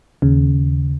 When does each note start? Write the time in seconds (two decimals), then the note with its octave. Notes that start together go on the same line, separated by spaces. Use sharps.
0.22 D#2 C#3